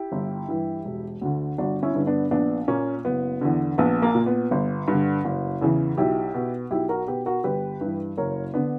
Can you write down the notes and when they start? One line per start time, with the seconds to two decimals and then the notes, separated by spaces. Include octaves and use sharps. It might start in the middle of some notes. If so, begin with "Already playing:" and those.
Already playing: E4 G4
0.12 G1
0.48 G2 E3
0.85 E1
1.21 D2 D3
1.58 G1 D4 F#4
1.83 C#4 E4
1.95 G2 D3
2.07 B3 D4
2.31 A#1 B3 D4
2.68 A#2 A#3 C#4
3.05 F#1 B3
3.41 E2 D3
3.78 A#1 B3
4.02 A#3
4.15 A#2
4.26 B3
4.51 G1
4.88 G2 D3
5.25 F#1
5.61 E2 C#3 E3
5.98 B1 E4 G4
6.34 B2
6.71 B1 E4 G4
6.89 F#4 A#4
7.07 B2 G4 B4
7.26 F#4 A#4
7.44 G1 G4 B4
7.81 G2 E3
8.17 F#1 A#4 C#5
8.54 D3 B3 D4